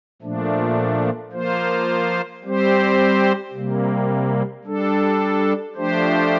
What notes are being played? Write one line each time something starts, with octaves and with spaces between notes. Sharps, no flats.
A#2 F3 A3 D4
F3 A#3 F4 C5
G3 C4 G4 C5
C3 G3 A#3
G3 D4 A4
F3 A3 D4 G4 C5